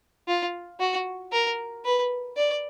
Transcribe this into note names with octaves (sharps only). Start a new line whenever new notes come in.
F4
F#4
A#4
B4
D5